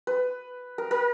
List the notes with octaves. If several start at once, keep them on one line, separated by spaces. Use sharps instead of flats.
B4
A#4
A#4